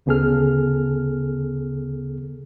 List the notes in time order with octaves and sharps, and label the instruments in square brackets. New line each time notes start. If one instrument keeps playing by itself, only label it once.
[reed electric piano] D2 C#3 B3 G#4 A4 F6